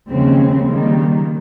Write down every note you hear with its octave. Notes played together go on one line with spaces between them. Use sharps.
D#2 C#3 F3 G#3 C4
D#3 G3 A#3